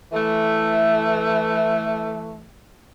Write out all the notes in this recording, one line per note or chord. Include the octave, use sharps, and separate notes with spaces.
E3 A3